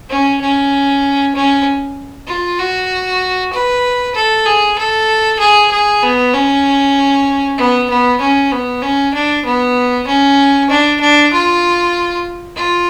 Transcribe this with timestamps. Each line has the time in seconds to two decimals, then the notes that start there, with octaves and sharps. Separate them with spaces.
0.10 C#4
0.41 C#4
1.36 C#4
2.28 F4
2.59 F#4
3.53 B4
4.15 A4
4.46 G#4
4.78 A4
5.40 G#4
5.71 G#4
6.03 B3
6.34 C#4
7.58 B3
7.90 B3
8.21 C#4
8.52 B3
8.82 C#4
9.14 D4
9.46 B3
10.07 C#4
10.70 D4
11.00 D4
11.33 F4
12.57 F4